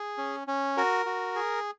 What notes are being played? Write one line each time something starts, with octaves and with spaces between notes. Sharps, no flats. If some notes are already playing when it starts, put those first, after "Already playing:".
Already playing: G#4
C#4
C#4
F#4 A#4
F#4
G#4